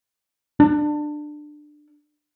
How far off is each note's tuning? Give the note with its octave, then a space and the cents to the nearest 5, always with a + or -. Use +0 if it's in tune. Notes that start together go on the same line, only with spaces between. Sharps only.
D4 +20